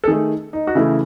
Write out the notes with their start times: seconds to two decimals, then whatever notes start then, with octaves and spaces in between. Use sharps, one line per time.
0.04 A4
0.07 D#3 A3 G#4
0.53 D#4
0.67 F#4
0.75 C#3 E3 A3 E4